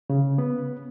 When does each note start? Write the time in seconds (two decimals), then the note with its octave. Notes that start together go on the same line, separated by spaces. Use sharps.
0.10 C#3
0.38 B3